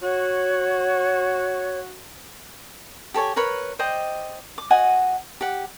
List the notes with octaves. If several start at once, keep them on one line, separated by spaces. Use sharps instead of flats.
F#4 C#5
G4 A4 C#5 G#5
A#4 B4 C#5 B5
C5 D5 D#5 G5
D6
F#4 D#5 F#5 G#5
G4 F#5